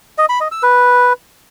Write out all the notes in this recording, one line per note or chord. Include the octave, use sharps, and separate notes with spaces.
D#5
B5
D#5
E6
B4